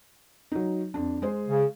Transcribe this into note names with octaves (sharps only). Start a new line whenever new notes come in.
F#3 D#4
F2 D4
G#3 G#4 C5
C#3